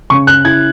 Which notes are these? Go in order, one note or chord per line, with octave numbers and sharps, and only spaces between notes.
C#3 C#6
F#6
E4 G#6